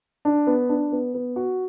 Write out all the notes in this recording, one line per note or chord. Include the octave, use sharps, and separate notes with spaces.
D4
B3
D4
B3
B3
F#4